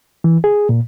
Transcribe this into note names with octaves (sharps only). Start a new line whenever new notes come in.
E3
G#4
A#2